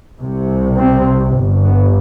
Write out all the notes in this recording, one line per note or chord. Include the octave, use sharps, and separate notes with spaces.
C2 C3
C4
G1
G2
B3